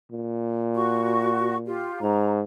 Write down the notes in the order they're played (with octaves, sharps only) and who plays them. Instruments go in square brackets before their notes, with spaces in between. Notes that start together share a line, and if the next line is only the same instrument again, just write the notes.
[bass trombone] A#2
[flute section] F#4 C#6
F4 G4
[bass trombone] G#2 [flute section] A#5